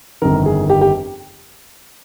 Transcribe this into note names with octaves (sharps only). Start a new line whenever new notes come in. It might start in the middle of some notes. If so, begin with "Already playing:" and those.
G1 F2 D#3 A#4
G#4
G4
G4